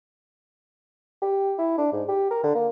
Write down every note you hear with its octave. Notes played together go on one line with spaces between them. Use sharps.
G4
E4
D4
G#2
G4
A#4
D3
A#3